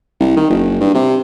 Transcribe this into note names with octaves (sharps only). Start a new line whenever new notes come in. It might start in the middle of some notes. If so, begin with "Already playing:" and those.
C2
D#3
F#1
G2
C3